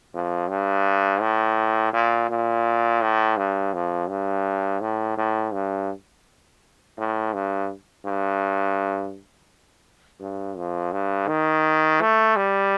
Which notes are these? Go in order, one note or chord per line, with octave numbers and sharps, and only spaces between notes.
F2
G2
A2
A#2
A#2
A2
G2
F2
G2
A2
A2
G2
A2
G2
G2
G2
F2
G2
D#3
A3
G3